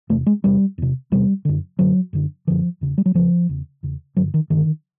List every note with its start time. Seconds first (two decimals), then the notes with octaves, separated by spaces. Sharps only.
0.09 E2 C3 A3
0.27 G#3
0.44 E2 C3 G3
0.78 E2 C3
1.12 E2 C3 G3
1.45 F#2 D3
1.79 F#2 D3 F#3
2.13 F#2 D3
2.47 F#2 D3 F3
2.81 E2 C#3
2.98 G3
3.06 F#3
3.14 E2 C#3 F3
3.49 E2 C#3
3.83 E2 C#3
4.17 G2 D3 F#3
4.34 D#3
4.50 G2 D3 D#3